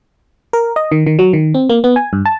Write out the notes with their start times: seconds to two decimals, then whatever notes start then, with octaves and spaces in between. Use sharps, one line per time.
0.53 A#4
0.76 D#5
0.92 D#3
1.07 D#3
1.19 F#3
1.33 D#3
1.54 C4
1.69 A#3
1.84 B3
1.96 G#5
2.13 G2
2.25 A5